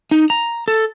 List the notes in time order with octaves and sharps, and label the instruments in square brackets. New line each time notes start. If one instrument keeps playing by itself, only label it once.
[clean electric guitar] D#4
A#5
A4